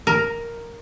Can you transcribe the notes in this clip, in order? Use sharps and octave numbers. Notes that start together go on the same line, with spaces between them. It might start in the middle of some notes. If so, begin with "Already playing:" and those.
A#4